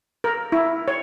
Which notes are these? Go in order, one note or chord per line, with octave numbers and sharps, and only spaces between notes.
A#4
E4
C#5